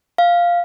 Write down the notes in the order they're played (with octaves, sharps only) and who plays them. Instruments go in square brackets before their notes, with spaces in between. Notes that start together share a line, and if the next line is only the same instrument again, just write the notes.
[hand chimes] F5